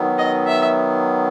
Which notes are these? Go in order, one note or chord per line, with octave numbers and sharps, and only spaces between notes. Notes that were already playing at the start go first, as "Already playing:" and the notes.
Already playing: D#3 F#3 B3
D#5
E5